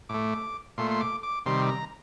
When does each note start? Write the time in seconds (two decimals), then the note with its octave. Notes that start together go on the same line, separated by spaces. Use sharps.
0.09 A2 A3 D6
0.78 A#2 A3 C6
0.91 C6
1.01 D6
1.23 D6
1.46 C3 D#3 G3 C6
1.69 A#5